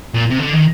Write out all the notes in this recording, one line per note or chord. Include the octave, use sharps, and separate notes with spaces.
A#2
C3
D3
D#3